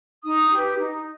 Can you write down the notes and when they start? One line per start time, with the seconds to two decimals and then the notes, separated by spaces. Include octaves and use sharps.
0.24 D#4 D#6
0.51 G4 B4
0.79 D#4